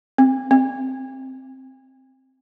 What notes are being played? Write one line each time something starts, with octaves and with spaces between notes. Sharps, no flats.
C4
C4